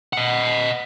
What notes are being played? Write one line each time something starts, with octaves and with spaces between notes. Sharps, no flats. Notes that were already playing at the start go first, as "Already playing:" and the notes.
D#5 F#5